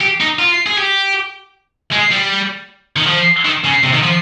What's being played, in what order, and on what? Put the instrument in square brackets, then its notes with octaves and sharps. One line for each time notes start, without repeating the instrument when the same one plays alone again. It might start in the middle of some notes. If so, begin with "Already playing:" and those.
[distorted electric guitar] G4
D#4
F4
G#4
G4
G#3
G3
D#3
F3
D#3
C#3
C3
D#3
F3